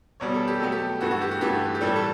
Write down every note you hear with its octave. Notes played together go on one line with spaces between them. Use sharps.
E2 B2 G3 C#5
A4
G4
B2 F#3 A3 A4
G4
G2 E3 A3 F#4
F#4
G4
F#4
G2 E3 A3 G4
G4
A2 E3 G3 A4
A4